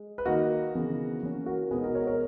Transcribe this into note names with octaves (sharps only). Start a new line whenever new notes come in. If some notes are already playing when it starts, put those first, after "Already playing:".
Already playing: G#3
B4
D#3 A#3 D#4 F#4 A#4
C#3 E3 B3
E3 A#3 C#4
F#4 A#4
B2 G#3 B3 D#4 G#4 B4
F#4 A#4
A#4 C#5
A#4 C#5